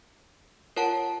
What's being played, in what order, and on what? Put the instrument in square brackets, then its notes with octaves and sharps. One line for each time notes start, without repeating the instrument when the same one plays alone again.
[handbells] F4 A#4 C#5 F#5 A5